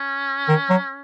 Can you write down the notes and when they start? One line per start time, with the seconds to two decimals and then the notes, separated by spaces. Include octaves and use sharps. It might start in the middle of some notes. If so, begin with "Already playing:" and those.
Already playing: C#4
0.49 D#3
0.70 F#3